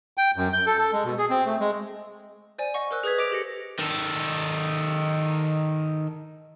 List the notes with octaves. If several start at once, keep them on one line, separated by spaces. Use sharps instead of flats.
G5
F#2
G6
A4
A4
G#3
B2
G#4
C4
A3
G#3
C5 D5 G#5 D#7
D#5 F#5 C#6
A#4 C5 E6 F#6
G#4 B4 D#6 G6 G#6 B6
D#5 D6 B6 D7 F7
G4 A4 A#6 C#7
D#3 A4